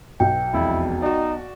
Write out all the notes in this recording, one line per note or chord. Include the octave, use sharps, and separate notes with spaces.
B1 B2 G5
E1 F2 E4
D#4 F#4 D5